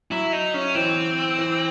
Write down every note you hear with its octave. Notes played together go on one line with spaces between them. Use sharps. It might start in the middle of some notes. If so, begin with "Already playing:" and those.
F#3 E4
D#4
C#4
E3 C4
E3